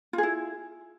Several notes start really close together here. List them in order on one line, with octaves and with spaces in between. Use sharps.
F4 G#4 E4